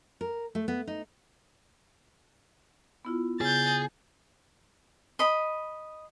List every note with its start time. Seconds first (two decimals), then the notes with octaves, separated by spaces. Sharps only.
0.21 A#4
0.55 A3
0.68 B3
0.87 D#4
3.05 B3 E4 F4
3.41 C#3 B3 G#4 G6 A6
5.19 D#5 B5